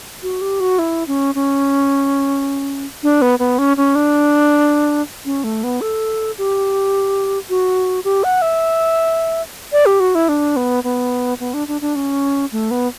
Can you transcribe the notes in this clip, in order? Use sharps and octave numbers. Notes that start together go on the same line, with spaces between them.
F#4
G4
F#4
E4
C#4
C#4
D4
B3
B3
C#4
C#4
D4
C#4
A3
B3
A4
G4
F#4
G4
F#5
E5
D5
G4
F#4
E4
D4
B3
B3
B3
D4
D4
D4
C#4
A3
B3